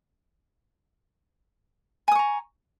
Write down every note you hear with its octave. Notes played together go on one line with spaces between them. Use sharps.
G#5 A#5 C#6 D#6